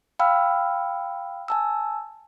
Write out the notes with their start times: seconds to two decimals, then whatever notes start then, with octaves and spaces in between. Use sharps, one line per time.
0.19 F5 G5 B5 E6 F6
1.48 G#5 A5 E6